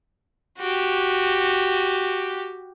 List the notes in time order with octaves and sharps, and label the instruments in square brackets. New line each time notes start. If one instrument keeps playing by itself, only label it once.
[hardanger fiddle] F#4 G4